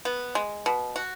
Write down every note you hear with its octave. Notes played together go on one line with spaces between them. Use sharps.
B3
G#3
B2
F#4